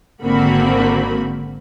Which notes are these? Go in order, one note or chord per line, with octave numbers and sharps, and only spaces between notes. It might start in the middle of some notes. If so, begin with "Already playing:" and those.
G#1 D3 A#3 C4 F#4 B5